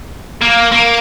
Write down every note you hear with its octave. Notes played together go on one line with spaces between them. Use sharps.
A#3
A#3